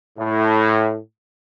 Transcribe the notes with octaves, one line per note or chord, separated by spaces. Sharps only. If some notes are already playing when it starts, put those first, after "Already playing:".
A2